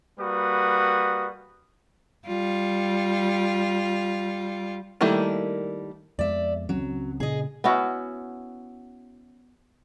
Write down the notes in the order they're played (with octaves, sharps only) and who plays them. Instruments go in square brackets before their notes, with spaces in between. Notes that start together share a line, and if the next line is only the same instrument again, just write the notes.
[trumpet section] G3 A#3 F#4 B4 D#6
[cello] G3 F4
[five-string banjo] D#3 G3 A3 A#3 E4
[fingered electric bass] F2 G#3 B3 [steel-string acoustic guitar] D5 E5
[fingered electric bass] C#2 C4 C#4 [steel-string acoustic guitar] F#3
[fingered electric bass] A#2 C#3 [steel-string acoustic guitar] G#4 D#5
[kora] B3 C#4 E4 F#4